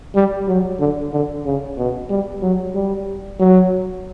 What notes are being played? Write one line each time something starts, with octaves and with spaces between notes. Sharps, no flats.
G3
F#3
D3
D3
C#3
B2
G3
F#3
G3
F#3